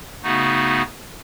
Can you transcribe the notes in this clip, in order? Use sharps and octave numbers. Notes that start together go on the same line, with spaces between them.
C#3 A3 B3 D#4 F#4